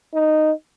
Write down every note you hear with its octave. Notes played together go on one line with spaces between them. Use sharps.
D#4